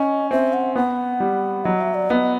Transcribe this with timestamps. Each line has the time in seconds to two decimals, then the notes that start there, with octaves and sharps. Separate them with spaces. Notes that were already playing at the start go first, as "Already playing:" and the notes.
Already playing: C#4 D#5
0.31 C4 E5
0.53 F#5
0.76 B3 F#5
1.20 G3
1.65 F#3 D#5
1.81 E5
1.95 D5
2.10 B3 D#5